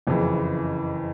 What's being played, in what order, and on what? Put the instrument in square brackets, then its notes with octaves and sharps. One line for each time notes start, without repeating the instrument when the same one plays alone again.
[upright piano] F#1 F2 C#3 E3